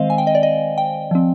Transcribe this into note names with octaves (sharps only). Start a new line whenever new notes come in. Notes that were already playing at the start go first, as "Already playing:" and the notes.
Already playing: D#3 G#3 C4 C5 D#5 F5
G#5
G5
D#5
D5
D#5
G5
F3 C4